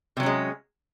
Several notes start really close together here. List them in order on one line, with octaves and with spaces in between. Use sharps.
C3 F#3 C#4 G#3